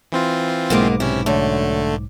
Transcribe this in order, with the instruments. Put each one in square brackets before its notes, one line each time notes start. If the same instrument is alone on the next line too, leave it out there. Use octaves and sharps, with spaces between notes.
[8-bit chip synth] E3 C4 F4
[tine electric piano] B1 G#2 D6 [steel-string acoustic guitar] G#3 A#3 B3
[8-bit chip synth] C3 C#4 [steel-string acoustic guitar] E4
[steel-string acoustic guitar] F#2 [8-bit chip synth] D3 A3